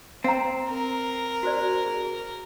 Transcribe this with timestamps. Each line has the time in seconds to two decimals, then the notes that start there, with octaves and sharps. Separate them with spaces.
0.24 C4 F5 A#5
0.69 A#4
1.43 F#4 C5 D5
1.86 G#4